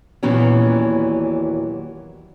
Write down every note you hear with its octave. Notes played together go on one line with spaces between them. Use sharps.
D#2 A#2 E3 F#3 B3 C#4